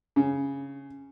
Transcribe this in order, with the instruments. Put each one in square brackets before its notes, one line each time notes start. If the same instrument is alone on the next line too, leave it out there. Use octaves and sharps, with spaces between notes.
[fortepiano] C#3